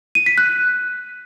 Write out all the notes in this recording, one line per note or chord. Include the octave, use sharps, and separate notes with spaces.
D#7
B6
F#6